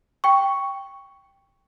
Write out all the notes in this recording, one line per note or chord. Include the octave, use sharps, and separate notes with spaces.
G5 C#6